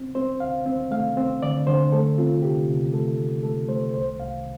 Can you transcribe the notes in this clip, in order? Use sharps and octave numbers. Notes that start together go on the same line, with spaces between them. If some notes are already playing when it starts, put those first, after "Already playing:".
Already playing: C4
C4 C5
D2 F5
C4
A3 F5
C4
D3 D5
D3 C5
A3 A4
C4 F4
C3 G4
C3
A3 A4
C3
A3 A4
A3 C5
C2 C5
C2 F5